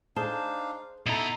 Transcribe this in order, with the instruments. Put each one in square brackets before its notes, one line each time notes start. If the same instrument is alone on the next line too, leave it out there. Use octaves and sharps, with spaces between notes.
[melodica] D4 D#4 F5 [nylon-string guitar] G#4 C5 A5
[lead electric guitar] B2 A#5 [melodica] D#4 E4 A4